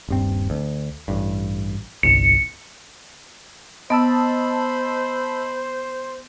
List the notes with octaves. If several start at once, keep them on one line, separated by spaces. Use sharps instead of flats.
D#1 G2 C4
D2
A1 G2
G1 C2 C#7
B3 C5 D#5 A5 B5 E6